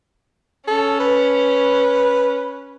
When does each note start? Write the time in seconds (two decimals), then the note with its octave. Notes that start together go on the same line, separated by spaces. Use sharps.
0.68 C#4 A4
1.00 B4